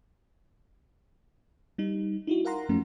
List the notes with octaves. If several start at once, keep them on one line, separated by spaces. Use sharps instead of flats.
G3 D#4
D#4 E4 F#4
A#4 F5 F#5 A#5 C6
F#2 F3 A3 C#4